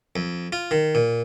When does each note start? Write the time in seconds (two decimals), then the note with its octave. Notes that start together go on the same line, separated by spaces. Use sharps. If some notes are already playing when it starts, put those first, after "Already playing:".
0.16 F2
0.52 F4
0.71 D#3
0.95 A#2